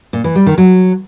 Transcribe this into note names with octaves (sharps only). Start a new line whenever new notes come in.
A#2
E3
G3
D#3
F#3